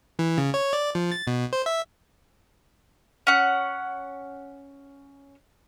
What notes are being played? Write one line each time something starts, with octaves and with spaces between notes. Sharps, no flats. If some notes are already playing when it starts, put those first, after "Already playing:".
E3
C#3
C#5
D5
F3
A6
B2
C5
E5
C#4 F#5